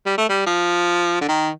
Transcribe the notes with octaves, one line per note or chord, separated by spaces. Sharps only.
G3
A3
G3
F3
D3
D#3